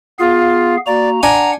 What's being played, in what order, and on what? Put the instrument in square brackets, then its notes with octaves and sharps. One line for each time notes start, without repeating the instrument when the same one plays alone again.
[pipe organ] B3 G#4 F5 [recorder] F4
[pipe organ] A#3 F#4 A#5 [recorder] D5
[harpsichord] D4 G#5 [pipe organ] F#5 [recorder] A#5